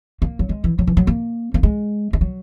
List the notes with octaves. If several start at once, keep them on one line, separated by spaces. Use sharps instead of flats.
A#3
F#3
G#3
E3
F#3
E3
F#3
A#3
A#3
G#3
G#3
F#3